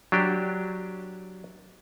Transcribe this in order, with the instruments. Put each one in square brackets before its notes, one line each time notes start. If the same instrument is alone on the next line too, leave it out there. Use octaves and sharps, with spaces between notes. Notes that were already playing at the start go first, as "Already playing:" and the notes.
[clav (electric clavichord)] F#3 D4 G4